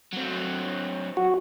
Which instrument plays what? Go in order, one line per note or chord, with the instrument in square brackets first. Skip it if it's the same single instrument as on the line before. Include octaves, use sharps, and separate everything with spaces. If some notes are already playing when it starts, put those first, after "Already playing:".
[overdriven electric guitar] F#3 C4
[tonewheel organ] F#4